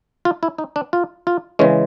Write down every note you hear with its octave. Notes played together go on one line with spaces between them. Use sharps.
F4
E4
D#4
D4
F4
F4
C#3 E3 G#3 C#4